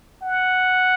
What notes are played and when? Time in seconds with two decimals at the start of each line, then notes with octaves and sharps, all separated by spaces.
0.22 F#5